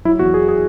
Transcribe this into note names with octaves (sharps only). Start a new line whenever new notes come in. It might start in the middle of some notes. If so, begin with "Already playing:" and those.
F#3 E4
E2 F#4
E2 G#4
G#4